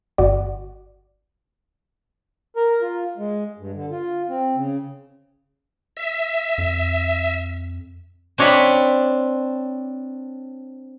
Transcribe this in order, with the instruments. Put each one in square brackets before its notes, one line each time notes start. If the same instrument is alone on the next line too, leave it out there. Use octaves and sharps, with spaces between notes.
[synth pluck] G1 F#4 D5
[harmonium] A#4
F4
G#3
G2
D3
F4
C4
C#3
[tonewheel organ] E5
[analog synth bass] F2
[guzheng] C4 D4 C#5 D#5 F5 B5